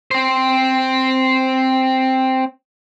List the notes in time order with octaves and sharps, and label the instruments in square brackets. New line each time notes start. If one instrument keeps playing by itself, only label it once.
[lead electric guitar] C4 C5